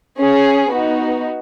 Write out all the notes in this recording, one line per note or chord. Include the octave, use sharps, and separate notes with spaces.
C#4 G#4
B3 D#4 F#4